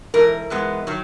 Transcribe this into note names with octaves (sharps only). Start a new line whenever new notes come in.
G#2 E3 A#4
G#2 E3 G#3 B3
D#3 F#3